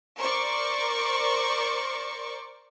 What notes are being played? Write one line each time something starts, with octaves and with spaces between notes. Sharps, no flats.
A#4 C5 D5 C#6